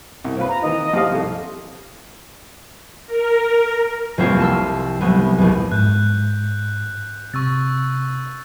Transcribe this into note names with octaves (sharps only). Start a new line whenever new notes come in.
C2
C4 F4 B4
A#5
D#3 E3 D#5
F3 G4 F5
C2 A4
A#4
F1 C2 A#3 C4 F4 C#5
A5 C6 E6
C2 F#3 A3 B3
A#1 E2
G#2 F#6 G6
C3 C#6 E6 A6